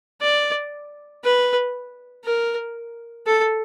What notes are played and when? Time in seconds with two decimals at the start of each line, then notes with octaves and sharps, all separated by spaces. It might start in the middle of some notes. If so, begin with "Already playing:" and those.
0.22 D5
1.24 B4
2.25 A#4
3.27 A4